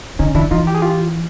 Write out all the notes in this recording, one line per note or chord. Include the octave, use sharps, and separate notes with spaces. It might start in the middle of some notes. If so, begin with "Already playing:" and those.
D3 C#4 D#4
D#3 D4 E4
E3 D#4 F4
G4
G#4
F4 G4